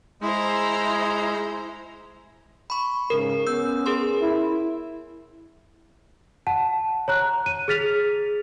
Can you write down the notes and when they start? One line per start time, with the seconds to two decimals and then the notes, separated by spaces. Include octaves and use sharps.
0.22 G#3 E4 C5 A#5
2.70 B5 C#6
3.10 G#2 C#3 A#4
3.47 B3 C#4 E6 G6
3.86 G#4 A#4 C6
4.22 E4
6.47 F#5 A5
7.08 C#5 A#5 F#6
7.46 D#7
7.68 G#4 F6 A6 B6 F7